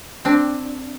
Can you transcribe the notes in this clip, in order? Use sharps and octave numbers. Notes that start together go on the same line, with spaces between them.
C4 D4